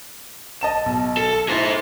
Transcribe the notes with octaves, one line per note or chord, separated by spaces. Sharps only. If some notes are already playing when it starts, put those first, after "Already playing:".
D#5 A5 E7
B1
A4
E4 G#4 C5 A6 A#6